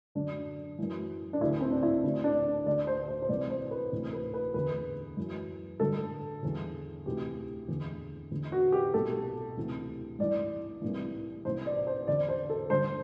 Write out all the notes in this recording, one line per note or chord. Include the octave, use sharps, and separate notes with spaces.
F#2 D3 D4
F#2 E3
D4
D2 D3 E4
C4
D4
E4
D2 D3 D4
D4
D2 D3 D5
C5
C5
C5
C2 C3 E3 D5
C5
B4
D2 C3 E3
B4
B4
E2 D3 B4
F#2 E3
G2 D3 A4
E2 D3
D2 C3 E3 G4
E2 D3
E2 D3
F#4
G4
C2 B2 A4
D2 C3 E3
G2 E3 D5
C2 C3 E3
C2 C3 E3 C5
D5
C5
E2 D3 D5
C5
A4
G2 D3 C5